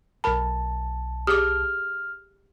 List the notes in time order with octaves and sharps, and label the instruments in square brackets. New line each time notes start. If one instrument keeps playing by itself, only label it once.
[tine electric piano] B1 A5 [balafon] A#4 B5
[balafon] G4 G#4 D6 [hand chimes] F6